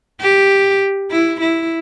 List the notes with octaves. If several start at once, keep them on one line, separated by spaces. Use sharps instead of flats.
G4
E4
E4